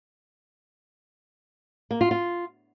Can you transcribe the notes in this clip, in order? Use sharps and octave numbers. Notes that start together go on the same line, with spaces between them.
A#3
F4
F4